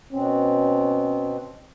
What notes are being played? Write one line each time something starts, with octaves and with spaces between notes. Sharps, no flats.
B2 C4 C#4